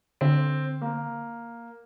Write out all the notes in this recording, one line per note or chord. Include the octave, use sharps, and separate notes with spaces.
D3 C4
A#3